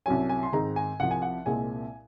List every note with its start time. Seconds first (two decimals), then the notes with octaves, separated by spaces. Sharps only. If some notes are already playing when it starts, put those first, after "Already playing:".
0.06 C2 C3 F#3 C#4 G#5
0.29 G#5
0.43 C6
0.52 G#2 D#3 G#3 C4 A#5
0.76 G#5
1.00 C2 C3 F3 F#5
1.11 G#5
1.22 F#5
1.46 C2 A#2 G#3 C4 G#5